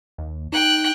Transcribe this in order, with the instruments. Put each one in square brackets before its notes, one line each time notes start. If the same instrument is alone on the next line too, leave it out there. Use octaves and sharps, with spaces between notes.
[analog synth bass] D#2
[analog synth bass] D#4 [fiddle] G5 F#6